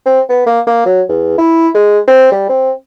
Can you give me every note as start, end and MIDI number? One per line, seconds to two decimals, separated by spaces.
0.06 0.21 60
0.29 0.44 59
0.46 0.60 58
0.67 0.83 58
0.86 1.01 54
1.09 1.37 40
1.38 1.68 64
1.74 1.99 56
2.07 2.28 60
2.32 2.46 55
2.49 2.72 60